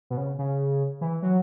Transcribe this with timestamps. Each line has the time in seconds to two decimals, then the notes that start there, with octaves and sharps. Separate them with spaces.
0.10 B2
0.17 C#3
0.39 C#3
1.01 E3
1.22 F#3